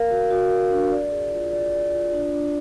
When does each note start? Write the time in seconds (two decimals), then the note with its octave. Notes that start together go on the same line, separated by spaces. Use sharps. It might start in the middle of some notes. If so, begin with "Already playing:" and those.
Already playing: A#4 F5
0.10 F#4
0.30 F#4
0.50 A#4
0.71 D4
0.91 D5
1.11 G#4
1.32 F4
1.51 D5
1.72 D5
1.92 F4
2.12 D4
2.32 D4